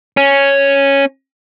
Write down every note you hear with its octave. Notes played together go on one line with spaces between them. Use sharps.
C#4